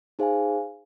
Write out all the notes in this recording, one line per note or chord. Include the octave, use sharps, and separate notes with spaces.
D#4 G#4 C5 F5 G#5